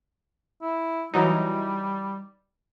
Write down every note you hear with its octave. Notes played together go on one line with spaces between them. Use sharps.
E4
E3 F#3 G3 D#4